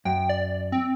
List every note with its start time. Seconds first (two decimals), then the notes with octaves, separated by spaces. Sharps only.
0.05 F#2 G5
0.29 D5
0.72 C4